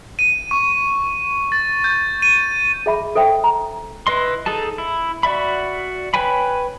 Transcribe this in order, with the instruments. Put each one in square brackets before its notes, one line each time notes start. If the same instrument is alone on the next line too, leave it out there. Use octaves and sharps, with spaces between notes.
[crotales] D#7
C#6
A6
G6
D#7
[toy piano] G#4 E5 B5
A4 C5 E5 G5
A#5
[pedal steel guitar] E4 B4 D#5 C6
D#4 G#4 A4 A5
E4
F#4 D5 E5 B5
B4 C#5 G5 G#5 B5